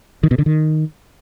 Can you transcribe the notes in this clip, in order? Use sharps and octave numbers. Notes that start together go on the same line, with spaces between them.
D#3
B2
D3
D#3